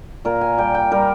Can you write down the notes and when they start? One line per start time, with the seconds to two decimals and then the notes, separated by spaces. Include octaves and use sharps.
0.25 A#2 A#4
0.41 G#5
0.58 G3 G5
0.74 G5
0.91 G3 A#4